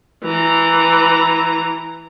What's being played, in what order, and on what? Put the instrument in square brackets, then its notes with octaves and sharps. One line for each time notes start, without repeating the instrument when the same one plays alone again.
[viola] E3 A#5